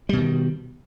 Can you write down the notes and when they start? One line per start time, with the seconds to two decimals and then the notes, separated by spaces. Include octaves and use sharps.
0.09 G3
0.13 B2
0.17 D#3